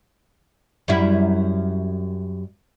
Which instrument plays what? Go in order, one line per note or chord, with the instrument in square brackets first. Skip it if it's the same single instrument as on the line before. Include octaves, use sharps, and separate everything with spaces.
[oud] F#2 G3 E4